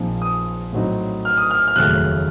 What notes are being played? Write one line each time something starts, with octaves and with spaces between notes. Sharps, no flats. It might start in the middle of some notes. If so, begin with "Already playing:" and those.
Already playing: A#1 A#2 F3 C4 D#4
D#6
A2 F#3 C4 D#4
F6
D#6
F6
F6
F1 D#2 C#3 F#3 A3 F#6